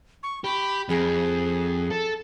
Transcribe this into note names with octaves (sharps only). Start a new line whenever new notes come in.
C#6
G4 B5
F2 G#4
A4